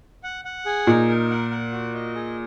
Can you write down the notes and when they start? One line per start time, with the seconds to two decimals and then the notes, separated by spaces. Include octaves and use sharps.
0.24 F#5
0.45 F#5
0.66 G#4
0.87 A#2 D#4
1.08 A#4
1.30 F#5
1.51 F#5
1.72 F#4
1.94 D#5
2.15 G#4